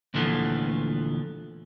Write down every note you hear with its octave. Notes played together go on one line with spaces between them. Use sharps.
D2 A#2 E3 F3 A3 B3